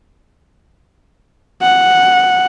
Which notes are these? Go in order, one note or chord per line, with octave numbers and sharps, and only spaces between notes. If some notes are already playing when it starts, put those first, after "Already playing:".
F#5